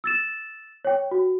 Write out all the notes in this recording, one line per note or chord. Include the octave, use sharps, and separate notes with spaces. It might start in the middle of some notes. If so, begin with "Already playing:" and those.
E6 A6 E7
C#5 G5
F#4